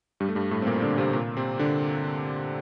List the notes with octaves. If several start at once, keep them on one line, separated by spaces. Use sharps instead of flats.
G2 G3
A3
G2 G3
A2 A3
C4
A#2 A#3
C4
D3 D4
C3 C4
A#2 A#3
C3 C4
D3 D4